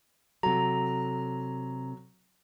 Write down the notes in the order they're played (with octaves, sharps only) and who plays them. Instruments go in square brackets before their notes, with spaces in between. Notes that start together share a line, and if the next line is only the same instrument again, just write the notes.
[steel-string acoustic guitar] C3 A4 [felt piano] F#3 [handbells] A#5